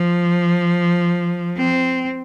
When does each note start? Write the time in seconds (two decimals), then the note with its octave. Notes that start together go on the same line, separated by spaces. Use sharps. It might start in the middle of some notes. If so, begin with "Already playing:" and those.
Already playing: F3
1.56 C4